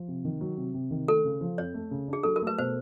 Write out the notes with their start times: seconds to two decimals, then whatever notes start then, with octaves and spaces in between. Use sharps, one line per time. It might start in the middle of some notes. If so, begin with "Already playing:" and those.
Already playing: F3
0.08 C3
0.25 D#3
0.41 F#3
0.57 C3
0.74 C3
0.91 D#3
1.08 A3 A4
1.24 C#3
1.41 F3
1.58 F2 C#5
1.74 A3
1.91 C#3
2.08 D4 G#4
2.23 F#3 A4
2.36 A#4
2.42 A3
2.47 B4
2.58 B2 C5